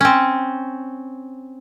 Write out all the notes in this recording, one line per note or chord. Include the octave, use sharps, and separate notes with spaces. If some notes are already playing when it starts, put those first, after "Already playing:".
C4 C#4